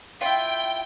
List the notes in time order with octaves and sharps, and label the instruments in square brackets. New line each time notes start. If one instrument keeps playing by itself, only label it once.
[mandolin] E4 F4 [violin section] G5